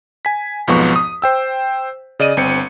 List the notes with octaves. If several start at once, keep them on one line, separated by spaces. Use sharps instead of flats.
G#5 B6
B1 F2 G#2 F3 B3 C#6
D#6
C5 G5 E6
C#3 D5 D#5 D#7
G1 C4 C#7